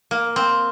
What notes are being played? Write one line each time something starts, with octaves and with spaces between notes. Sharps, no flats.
A#3
C4